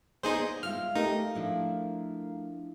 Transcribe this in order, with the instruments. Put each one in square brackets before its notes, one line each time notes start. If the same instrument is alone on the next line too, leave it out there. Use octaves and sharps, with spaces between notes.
[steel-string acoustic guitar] A#3 B3 D5 [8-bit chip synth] D#4 G#4 C5
[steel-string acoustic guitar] G#3 F4 E5 [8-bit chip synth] F6
[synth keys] A3 A#4 F5 [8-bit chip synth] D#4 [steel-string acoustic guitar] G4
[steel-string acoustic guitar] F3 D4 E4